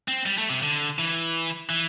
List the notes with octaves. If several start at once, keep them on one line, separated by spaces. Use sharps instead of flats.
C4
G3
A3
C3
D3
E3
E3